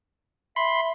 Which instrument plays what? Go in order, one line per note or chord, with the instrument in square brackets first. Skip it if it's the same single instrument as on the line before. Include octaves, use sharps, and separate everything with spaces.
[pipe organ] E5 [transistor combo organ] B5 C6